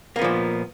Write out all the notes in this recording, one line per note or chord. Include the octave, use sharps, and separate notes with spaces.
A#2 F3 A#3 B3